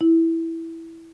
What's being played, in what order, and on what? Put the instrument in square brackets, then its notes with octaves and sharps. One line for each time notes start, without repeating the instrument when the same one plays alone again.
[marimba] E4